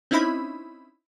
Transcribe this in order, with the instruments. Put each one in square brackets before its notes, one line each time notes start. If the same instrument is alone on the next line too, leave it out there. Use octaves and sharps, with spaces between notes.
[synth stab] C4 C#4 D#4 E4 B5